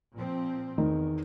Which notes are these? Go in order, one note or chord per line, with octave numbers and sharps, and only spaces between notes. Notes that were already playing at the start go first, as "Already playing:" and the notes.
A#2 F3 C4
E2 D#3